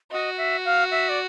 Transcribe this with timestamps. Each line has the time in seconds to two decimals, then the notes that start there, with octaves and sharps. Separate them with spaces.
0.11 F#4 D#5
0.38 E5
0.65 F5
0.91 E5
1.09 D5